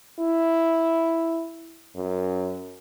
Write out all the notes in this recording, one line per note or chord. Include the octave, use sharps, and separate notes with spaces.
E4
F#2